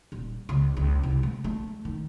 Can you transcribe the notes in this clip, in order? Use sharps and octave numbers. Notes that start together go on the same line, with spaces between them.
D#1
C#2
C#2
C2
A3
A3
D#3